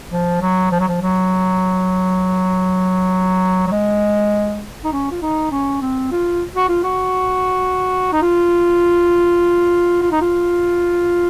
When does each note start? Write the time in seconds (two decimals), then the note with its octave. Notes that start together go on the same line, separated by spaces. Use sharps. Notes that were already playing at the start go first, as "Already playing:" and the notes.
0.11 F3
0.42 F#3
0.72 F3
0.80 F#3
0.88 F3
1.02 F#3
3.68 F#3
3.72 G#3
4.84 D#4
4.93 C#4
5.12 F4
5.22 D#4
5.52 C#4
5.82 C4
6.12 F4
6.55 F#4
6.69 F4
6.83 F#4
8.13 D#4
8.22 F4
10.02 F4
10.12 D#4
10.22 F4